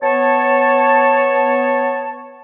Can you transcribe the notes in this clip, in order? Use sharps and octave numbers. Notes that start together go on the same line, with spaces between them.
B3 C#5 A5